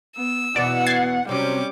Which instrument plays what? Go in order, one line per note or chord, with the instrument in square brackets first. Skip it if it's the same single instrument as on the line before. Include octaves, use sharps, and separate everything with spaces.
[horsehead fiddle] B3 [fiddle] E6
[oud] E2 B2 E3 [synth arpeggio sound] D5 [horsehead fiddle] F#5
[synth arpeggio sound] G#6 A6 C7
[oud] C3 F#3 [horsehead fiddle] G3 [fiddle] C#4 D6